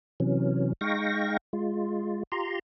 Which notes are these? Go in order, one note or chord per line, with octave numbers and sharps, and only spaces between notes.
C3 E3 F#3 C#4
G#3 D#4 F5 G5 C#6 A#6
G#3 F4
F4 G4 A#5 C6